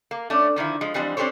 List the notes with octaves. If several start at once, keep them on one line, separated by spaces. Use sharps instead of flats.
A#3
A3 C#4 D4
D3 D#3 F3 E4
F3 G#3
E3 F3 G3 G#3 C4 D4
C4 D4 G4 A4 C5 C#5